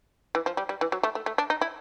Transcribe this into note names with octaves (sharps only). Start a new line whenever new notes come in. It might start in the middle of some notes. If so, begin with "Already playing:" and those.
E3
F3
G3
G3
E3
F#3
A3
A3
A3
D4
D#4
E4